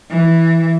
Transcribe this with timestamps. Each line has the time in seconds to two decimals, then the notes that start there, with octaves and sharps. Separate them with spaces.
0.11 E3